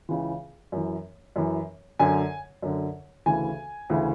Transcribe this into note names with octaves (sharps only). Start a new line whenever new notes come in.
C#2 C#3 E3
F#2 E3
F#2 E3
F#2 D3 G#5
F#2 D3
D2 C#3 E3 G#5
D2 C#3 E3